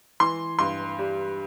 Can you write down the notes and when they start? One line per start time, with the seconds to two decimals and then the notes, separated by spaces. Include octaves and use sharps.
0.20 E3 C6
0.59 G2 C6
0.99 G3